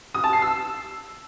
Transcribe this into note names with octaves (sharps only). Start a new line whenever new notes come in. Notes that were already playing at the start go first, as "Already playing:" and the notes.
D#6
A5
C7
E6